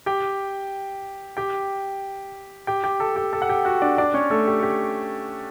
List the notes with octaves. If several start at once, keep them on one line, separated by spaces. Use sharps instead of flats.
G4 G5
G4 G5
G4 G5
G4 G5
A4 A5
G4 G5
A4 A5
F#5
G4 G5
F#4 F#5
D4 D5
D4 D5
C#4 C#5
A3 A4
G4
G4